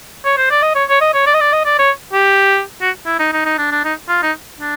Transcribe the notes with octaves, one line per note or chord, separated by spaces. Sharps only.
C#5
C5
D5
D#5
C#5
C#5
D#5
C#5
D5
D#5
D5
D#5
D5
C#5
G4
F#4
E4
D#4
D#4
D#4
D4
D4
D#4
F4
D#4
D4